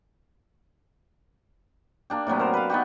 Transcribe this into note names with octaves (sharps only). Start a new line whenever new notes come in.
A#3 D4 G4
A2 C3 F#3 B3
A#4 C5
B4 F5
B3 D#4 F#4 G4